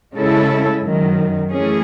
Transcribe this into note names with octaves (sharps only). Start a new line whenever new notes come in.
C#3 G#3 C#4 E4 A4
F#2 D#3 F#3
E3 A3 C#4 G#4